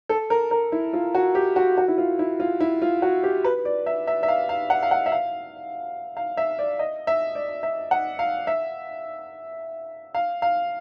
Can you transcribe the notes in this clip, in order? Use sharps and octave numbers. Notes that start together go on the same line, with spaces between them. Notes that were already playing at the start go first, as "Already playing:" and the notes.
A4
A#4
A#4
E4
F4
F#4
G4
F#4
F#4
E4
F4
E4
F4
E4
F4
F#4
G4
B4
D5
E5
E5
E5
F5
F5
F#5
F5
F#5
E5
F5
F5
E5
D5
D#5
E5
D5
E5
F#5
F5
E5
F5
F5